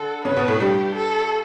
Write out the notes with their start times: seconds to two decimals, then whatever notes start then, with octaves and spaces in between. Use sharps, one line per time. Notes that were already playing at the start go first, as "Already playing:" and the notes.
Already playing: D3 A4
0.25 C#3 C#4 B4
0.36 B2 B3
0.48 A2 A3
0.59 G2 G3 G4
0.95 A4